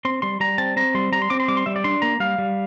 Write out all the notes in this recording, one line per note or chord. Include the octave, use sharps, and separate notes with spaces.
C4 C6
G3 C6
G3 A#5
C4 A5
C4 A#5
G3 C6
G3 A#5
C6
C4 D6
C6
G3 D6
C6
G3 E5
D5
D4 C6
A#3 A#5
G3 F5
G3